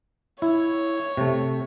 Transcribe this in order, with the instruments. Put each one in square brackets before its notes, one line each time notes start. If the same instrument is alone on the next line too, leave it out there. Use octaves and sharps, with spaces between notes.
[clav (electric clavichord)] E4 [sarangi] C#5
[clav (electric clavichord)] C3 A3